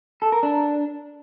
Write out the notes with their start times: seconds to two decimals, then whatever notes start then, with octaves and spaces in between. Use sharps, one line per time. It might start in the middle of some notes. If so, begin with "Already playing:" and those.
0.22 A4
0.32 A#4
0.43 D4